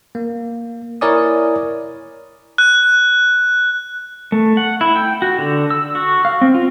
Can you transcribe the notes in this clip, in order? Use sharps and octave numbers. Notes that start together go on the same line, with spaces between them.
A#3
E4 A#4 C#5 D5 G#5 D#6
F#6
A3
F#5
E4
G5
F#4
D3
E6
F#4
F5
C4
F4